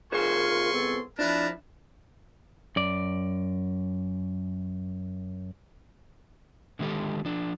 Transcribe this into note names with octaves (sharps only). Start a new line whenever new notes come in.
C2 F4 G#4 A#4 C5 G#5 C6 C#6
B3 A4
F3 D4 E4 A#4 B4 A5
F#2 D5
D3 D#3 G#3 G4 A4
F3 D4